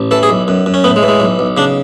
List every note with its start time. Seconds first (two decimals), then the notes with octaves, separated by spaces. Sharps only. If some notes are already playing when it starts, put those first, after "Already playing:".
Already playing: A1
0.11 E3 A4
0.23 G#4
0.29 B1
0.48 F#2
0.66 F#2
0.74 C#4
0.84 A2 B3
0.96 G#3
1.03 E3
1.08 G#3
1.20 B1
1.39 B1
1.57 C#3 D4